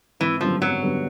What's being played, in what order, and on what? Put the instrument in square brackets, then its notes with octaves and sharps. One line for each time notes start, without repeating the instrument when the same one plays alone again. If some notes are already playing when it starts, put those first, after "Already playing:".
[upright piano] G#1 [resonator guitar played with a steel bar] E3
[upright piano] F#2 D3 G3 B3 [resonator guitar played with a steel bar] F3
[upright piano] G#1 [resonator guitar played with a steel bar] F#3
[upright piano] F#2 D3 G3 B3